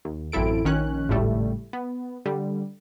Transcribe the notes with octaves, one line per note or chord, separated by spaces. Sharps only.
D#2
A1 F#2 C4 E4 A4 D7
A#1 D#3 C#4 F#6
G#1 C#2 A2 G3 A3
B3
D3 G3